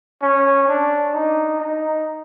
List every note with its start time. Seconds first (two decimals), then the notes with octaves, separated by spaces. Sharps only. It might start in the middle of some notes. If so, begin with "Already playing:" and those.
0.22 C#4
0.68 D4
1.14 D#4
1.60 D#4